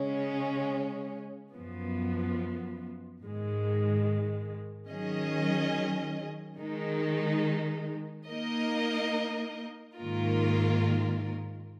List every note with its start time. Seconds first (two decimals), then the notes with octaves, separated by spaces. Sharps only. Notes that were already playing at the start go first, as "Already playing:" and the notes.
Already playing: C#3 G#3 C#4
1.51 F#2 F3 B3
3.20 G#2 D#3 G#3
4.90 D#3 F#3 C#4 G#4 D#5
6.58 D#3 G#3 D#4
8.27 A#3 D#4 A#4 D#5
9.97 G#2 D#3 A#3 F4 A#4